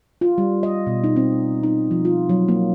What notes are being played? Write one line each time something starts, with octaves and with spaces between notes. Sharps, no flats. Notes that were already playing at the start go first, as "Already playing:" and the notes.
F4
G3
D#5
B2
D#4
C4
D#4
F3
F4
F#3
A#3